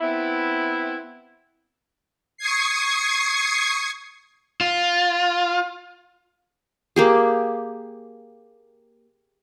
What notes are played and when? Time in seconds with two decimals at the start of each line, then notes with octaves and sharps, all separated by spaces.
0.01 B3 C4 E4
2.37 C#6 D#6 G#6 C7
4.61 F4
6.96 A#3 G4 G#4